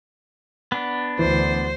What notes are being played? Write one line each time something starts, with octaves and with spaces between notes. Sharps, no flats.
B3 D4
D2 E3 C5